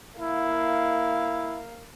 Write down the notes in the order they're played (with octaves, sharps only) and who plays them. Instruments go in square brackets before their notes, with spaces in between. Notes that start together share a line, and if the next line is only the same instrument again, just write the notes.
[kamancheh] A#3 F5 [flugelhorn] E4